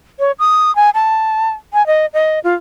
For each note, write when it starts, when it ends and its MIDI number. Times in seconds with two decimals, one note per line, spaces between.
0.19 0.32 73
0.39 0.74 87
0.76 0.90 80
0.94 1.50 81
1.73 1.86 80
1.87 2.06 75
2.14 2.39 75
2.44 2.54 65